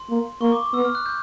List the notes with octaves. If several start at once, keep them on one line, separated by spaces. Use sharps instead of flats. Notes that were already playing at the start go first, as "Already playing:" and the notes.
Already playing: C6
A#3
A#3 C#6
D6
D6
B3 E6
F6
F#6
G6